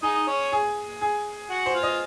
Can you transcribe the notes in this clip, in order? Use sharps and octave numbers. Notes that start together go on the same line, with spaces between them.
D#4 G#4 D#5
C#4 C#5
G#4
G#4
F#4 F#5
C5
F4 F5
D#5